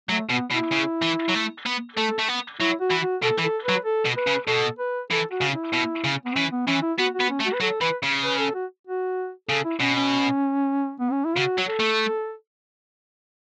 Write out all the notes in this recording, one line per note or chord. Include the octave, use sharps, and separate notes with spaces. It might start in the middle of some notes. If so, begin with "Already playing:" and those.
F#3 A3
B2 B3
B2 E4
C#3
E3
F#3
A3
B3
A3 A4
A3
B3
F#3 E4
F#4
E3
F#4
B2 A4
E3
A4
F#3 B4
A4
B2
B4
C#3
B2 A4
B4
E3 A4
F#4
C#3
E4
B2
C#3
B3
E3 C#4
B3
E3 C#4
E4
B3 F#4
F#4
B3
C#4
A3
F#4
B4
F#3 A4
E3 B4
C#3
B4
A4
F#4
F#4
C#3 A4
E4
B2 C#4
C#4
B3
C#4
E4
C#3 F#4
F#3
A4
A3